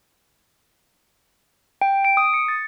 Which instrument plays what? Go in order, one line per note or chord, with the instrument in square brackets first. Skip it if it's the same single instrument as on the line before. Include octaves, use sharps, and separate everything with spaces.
[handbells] G5
D7
D#6
C#7
A6